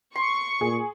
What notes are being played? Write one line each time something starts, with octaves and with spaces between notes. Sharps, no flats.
C6 C#6
A#2 G#4